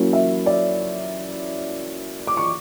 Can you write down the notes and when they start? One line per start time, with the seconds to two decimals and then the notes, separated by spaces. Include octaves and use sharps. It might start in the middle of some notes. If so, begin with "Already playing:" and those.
Already playing: F#3 A#3 C#4 E4
0.13 E5
0.46 D5
2.27 D6
2.37 C#6